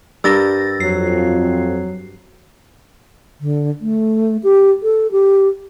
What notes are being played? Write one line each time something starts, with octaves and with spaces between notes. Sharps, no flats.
G2 G4 A#4 E6 A6 A#6
F2 F#3 C7
D3
A3
G4
A4
G4